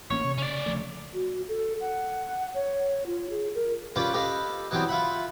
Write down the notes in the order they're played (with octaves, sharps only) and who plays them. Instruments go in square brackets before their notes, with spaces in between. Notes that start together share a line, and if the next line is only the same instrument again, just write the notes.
[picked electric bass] A1 A#3 C#4 [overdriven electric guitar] C#5
[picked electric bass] C3
[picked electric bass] C#3 [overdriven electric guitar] C#4 D5
[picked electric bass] D2 F3 A3
[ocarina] F#4
A4
F#5
C#5
F4
G#4
A#4
[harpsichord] G3 C#4 F4 B4 D5
G4 A4 B4 D#5 F5
E3 F#3 G3 B3 C4
F4 E5 F#5 B5